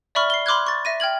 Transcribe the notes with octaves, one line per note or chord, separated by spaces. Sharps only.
D5 E5 B5 C#6 F6
C7 G7
B5 C6 D6 F6 F#6 G#6
C#6 A6
E5 A#6 D#7
G5 F6 G#6 F#7